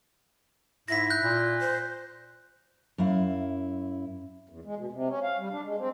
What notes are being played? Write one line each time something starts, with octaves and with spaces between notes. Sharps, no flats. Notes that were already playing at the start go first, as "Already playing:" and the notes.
G#2 E4 A#6 B6
F#6 G6
A#2
C5
F#2 E4 F5
E2
G#3
B2
C3
C#4
F5
G3
D4
G#3
C4